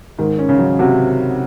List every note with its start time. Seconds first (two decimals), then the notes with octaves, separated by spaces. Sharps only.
0.18 G#2 D#3
0.39 C#4
0.49 C#3
0.59 F#3
0.79 C3 F#4